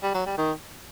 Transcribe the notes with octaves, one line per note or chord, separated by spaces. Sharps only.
G3
F#3
G3
D#3